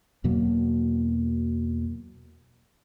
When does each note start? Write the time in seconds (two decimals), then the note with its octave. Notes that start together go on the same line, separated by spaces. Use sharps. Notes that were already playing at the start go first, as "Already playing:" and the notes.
0.24 E2 B2 F#3 A#3